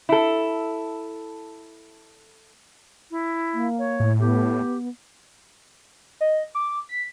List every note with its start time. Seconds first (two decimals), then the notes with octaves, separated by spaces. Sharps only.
0.09 E4 A4
3.11 E4
3.54 A#3
3.79 C#5
4.00 A2
4.20 B3 G4
6.21 D#5
6.55 D6
6.89 B6